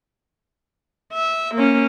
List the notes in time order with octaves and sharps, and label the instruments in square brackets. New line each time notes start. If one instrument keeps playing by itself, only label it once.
[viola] E5
A#3 C#4